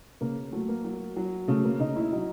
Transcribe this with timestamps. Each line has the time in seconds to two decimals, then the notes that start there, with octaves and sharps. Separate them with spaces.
0.21 C#3 A#3
0.52 F#3 A3
0.69 A#3
0.84 F#3
1.16 F#3
1.48 C#3 A3
1.64 A#3
1.80 C#3 D#4
1.96 E4
2.12 F#3 D#4